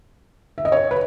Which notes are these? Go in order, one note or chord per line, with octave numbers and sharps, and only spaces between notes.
E5
D#5
C#5
B4